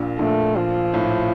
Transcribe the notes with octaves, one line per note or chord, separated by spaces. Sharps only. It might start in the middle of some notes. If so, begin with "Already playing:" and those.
Already playing: A#1 A#2
A#1 A#2 A3
F3
A2